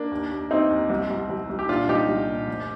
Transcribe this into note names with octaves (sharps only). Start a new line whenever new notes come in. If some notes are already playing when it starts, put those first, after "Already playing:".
Already playing: A#3 D4
D#2
D#2
D#2 C4 D#4
D#2
C2
C2
C2
C2
G4
A#2 D4 F4
C2 D#4 G4
C2
A#2
F1